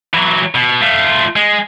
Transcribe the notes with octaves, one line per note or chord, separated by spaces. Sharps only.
E3 F#3
B2
A3 F4
G#3